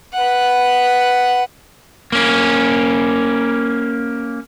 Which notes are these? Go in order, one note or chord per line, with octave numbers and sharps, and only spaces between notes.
B4 F#5
A#3 C#4